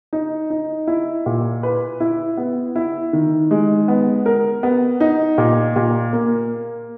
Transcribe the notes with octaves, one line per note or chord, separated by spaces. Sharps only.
D#4
D#4
E4
A#2
B4
E4
B3
E4
D#3
G#3
B3
A#4
B3
D#4
A#2
A#2
A#3